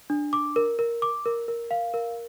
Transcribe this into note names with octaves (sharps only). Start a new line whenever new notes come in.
D4
D6
A#4
A#4
D6
A#4
A#4
F5
A#4